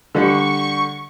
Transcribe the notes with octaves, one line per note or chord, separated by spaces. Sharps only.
D3 G3 C#6